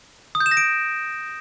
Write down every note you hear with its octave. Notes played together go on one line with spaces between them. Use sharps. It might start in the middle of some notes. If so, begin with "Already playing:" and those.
D#6
G6
E7
A#6
D7